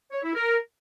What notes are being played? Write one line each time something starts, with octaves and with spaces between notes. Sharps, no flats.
C#5
E4
A#4